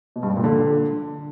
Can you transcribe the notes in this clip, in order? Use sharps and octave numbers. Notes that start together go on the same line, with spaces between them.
B2
G2
G3
A#2
D3